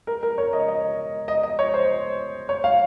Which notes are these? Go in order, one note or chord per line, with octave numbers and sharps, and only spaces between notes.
A#4
A#4
C#5
D#5
D#5
D#5
D#5
C#5
C5
C#5
F5